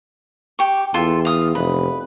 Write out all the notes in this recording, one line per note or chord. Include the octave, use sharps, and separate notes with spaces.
G4 C#6
E2 F4 A4
F5 D#6
F1 B4